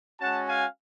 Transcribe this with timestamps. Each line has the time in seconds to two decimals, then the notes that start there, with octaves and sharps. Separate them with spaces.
0.20 G#3 C#4 F#4 F#5 A5
0.48 F5 G#5